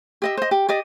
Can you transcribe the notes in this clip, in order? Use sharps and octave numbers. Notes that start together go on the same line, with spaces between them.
G4 D#5 E5
C5 D#5
G4
G4 D5 D#5